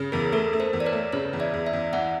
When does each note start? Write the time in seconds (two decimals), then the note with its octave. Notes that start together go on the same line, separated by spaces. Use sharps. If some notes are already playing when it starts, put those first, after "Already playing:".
Already playing: C#3
0.12 E2 G#4 A#4
0.32 A3 A4 B4
0.53 A3
0.60 A#4 C5
0.73 E2
0.80 D5
0.86 B4 C#5
0.93 A3
1.13 C#3 B4 C#5
1.33 E2
1.40 D5 E5
1.53 E2
1.67 D5 E5
1.73 E2
1.93 E3 E5 F#5